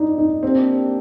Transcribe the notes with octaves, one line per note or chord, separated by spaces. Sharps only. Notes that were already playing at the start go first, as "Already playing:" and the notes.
Already playing: D4 D#4
D#4
A#3 C4 D4 G4